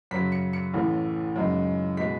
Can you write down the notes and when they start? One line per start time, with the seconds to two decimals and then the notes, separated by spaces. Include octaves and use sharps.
0.11 F#2 C#3 F#3 B6
0.32 C#7
0.53 C#7
0.74 A1 A2 E3
1.36 F#2 C#3 G#3 D#4
1.97 B2 G#3 B6